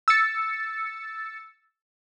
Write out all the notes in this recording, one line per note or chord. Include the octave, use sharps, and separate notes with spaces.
E6 A6 C#7